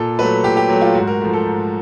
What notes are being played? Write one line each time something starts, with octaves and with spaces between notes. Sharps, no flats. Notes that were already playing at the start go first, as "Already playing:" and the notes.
Already playing: A#2 A4
F#3 A3 B4
A#2 G4
G4
F#3 A3
F4
G#2 F#4
A#4
F3 A3
A4
G#2